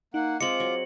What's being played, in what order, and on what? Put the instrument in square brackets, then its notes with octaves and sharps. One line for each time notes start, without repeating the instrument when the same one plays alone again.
[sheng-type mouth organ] A#3 F#5 [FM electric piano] D#4
[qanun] G#3 C4 G#4 [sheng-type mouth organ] F4 D6 [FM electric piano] D#5 [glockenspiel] C#7 F#7
[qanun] F#3